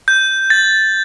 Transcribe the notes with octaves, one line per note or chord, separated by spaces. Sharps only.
G6
A6